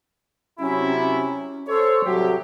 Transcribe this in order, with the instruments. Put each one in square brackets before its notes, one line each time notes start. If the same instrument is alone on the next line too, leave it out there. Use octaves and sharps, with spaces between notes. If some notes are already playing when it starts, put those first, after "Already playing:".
[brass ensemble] C3 F#3 E4 [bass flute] C#4
[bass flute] C#4
[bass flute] A4 [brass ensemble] C5 C#5
[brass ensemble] C2 A2 G4 [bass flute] F#3